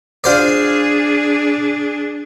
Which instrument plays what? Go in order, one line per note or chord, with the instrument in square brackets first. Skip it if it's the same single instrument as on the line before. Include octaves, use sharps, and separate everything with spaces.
[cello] D4 G#4 [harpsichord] F4 C5 D5